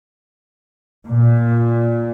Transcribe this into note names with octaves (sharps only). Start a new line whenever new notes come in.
A#2